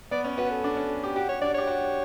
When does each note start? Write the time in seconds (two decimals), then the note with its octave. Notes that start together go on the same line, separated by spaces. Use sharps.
0.11 B3 D5
0.24 C#4
0.38 F#4 B4
0.51 A4
0.64 D4
0.77 C#4
1.03 G4
1.15 F#4 G4
1.29 C#5
1.42 D4 D5
1.54 G4 C#5
1.67 F#4